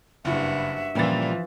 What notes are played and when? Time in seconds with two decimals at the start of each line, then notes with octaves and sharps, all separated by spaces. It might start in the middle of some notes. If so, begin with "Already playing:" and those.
0.25 F#1 G2 E4 F#4 E5
0.95 A#2 C#3 E3 F3 G3 C4 A6